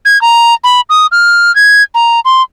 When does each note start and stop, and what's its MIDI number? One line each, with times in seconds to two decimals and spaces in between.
0.05 0.20 92
0.22 0.54 82
0.64 0.81 83
0.90 1.07 87
1.12 1.54 89
1.56 1.82 92
1.95 2.20 82
2.25 2.42 84